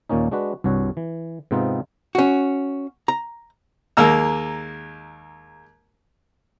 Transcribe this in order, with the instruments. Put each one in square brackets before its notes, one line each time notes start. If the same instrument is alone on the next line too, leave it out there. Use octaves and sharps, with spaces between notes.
[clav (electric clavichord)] D#2 A#2 A#3 C#4 D#4
G#3 D4 F#4 B4
C2 G2 F#4 C#5
E3
G#2 C3 B3 C4 D#4 F4
[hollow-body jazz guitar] C#4 F#4
A#5
[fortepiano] D#2 G#3 A#3 A#5 E6